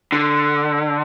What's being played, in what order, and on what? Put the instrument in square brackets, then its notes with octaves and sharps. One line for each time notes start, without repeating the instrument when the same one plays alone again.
[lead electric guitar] D3